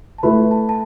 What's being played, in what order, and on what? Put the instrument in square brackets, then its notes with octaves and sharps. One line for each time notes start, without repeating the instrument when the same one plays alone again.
[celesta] A5
[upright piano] A3 E4 B4 [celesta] B5
[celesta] A5
A5